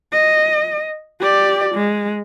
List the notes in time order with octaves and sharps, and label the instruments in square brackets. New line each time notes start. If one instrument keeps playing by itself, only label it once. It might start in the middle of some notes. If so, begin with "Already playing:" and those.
[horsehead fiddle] D#5
G4 D5
G#3